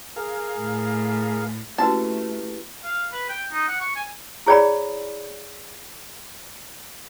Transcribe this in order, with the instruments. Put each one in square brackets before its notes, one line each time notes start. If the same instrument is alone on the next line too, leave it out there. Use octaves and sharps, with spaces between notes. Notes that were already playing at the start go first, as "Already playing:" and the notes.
[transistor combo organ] G#4 A#4 F5
[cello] A2
[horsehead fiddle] A3 [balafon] A#3 C#4 F#4 [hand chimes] E4 G4 B4 [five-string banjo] A5
[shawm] F5
B4
G5
D#4
F#5
C#6
G#5
[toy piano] E4 G#4 C#5 D5 G5 B5